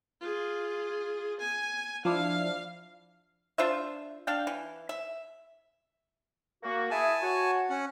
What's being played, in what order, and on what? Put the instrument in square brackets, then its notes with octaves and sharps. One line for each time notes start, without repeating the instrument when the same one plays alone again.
[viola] F4 G#4
G#5
[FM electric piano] F3 D4 E4 [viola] F5
[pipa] D4 F4 C5 E5
D4 F5 G5
E3
E5
[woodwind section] A#3 F#4
[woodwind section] E4 G#4 [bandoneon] G#5 A5
[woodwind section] F#4 C#5
[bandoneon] C#4 F#5